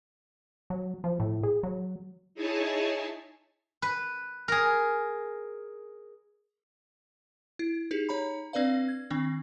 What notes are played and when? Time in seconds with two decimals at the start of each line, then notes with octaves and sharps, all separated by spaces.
0.70 F#3
1.04 F3
1.20 A2
1.43 G#4
1.63 F#3
2.34 D#4 E4 G#4 C#5 G#5 A5
3.82 B4
4.48 G#4 A#4
7.59 E4
7.91 D#4 G4 G#4
8.09 D#4 C#5 A#5 B5
8.53 C4 D4 B4 D5 F5
8.88 G#6
9.10 D#3 C4 D4